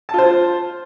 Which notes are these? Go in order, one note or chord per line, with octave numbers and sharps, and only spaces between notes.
F4 C5 A5